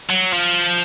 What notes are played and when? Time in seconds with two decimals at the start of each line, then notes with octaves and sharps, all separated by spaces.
0.10 F#3
0.33 F3